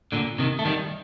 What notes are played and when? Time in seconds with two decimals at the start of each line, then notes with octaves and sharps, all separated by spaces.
0.12 A#2 D3
0.39 C3 D#3
0.59 A3
0.65 D#3 G3